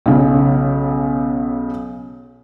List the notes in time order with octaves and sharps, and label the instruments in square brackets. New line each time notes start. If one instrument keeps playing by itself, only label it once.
[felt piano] B1 C#3